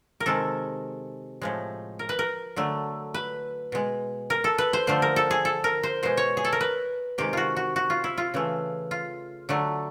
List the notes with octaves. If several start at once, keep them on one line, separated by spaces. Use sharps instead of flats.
A#4
C3 D#3 G#3 A4
A2 F3 G#3
A#4
B4
A#4
D3 F#3 A3
B4
B2 G#3
A#4
A4
B4
C5
D3 F3 A3 C5
A#4
A4
G#4
A4
A#4
C5
B2 G#3 C5
C#5
G#4
A4
A#4
B4
C3 D#3 G#3 G4
F4 F#4
F#4
F#4
F4
E4
F4
C#3 E3 A3
F4
D3 F#3 A3